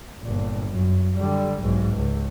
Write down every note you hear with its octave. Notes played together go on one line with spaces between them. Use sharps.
G1 A#2
F#2
D3 G3
B1 G#2
C#2